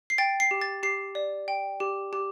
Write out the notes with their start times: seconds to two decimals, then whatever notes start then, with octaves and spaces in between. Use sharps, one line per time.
0.10 C7
0.18 G5 A6
0.40 C7
0.51 G4
0.62 A6
0.83 G4 C7
1.15 D5
1.48 G5
1.80 G4
2.13 G4